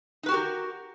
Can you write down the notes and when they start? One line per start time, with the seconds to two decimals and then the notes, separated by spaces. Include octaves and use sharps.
0.23 D#4
0.26 B4
0.29 F#4
0.31 G4
0.34 A#4